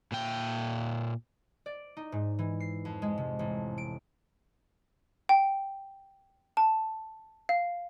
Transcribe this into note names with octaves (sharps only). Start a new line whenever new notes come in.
A#2 G5
D5
D#4
G#2
E3
C7
F2
G#3
C3
A1
D7
G5
A5
F5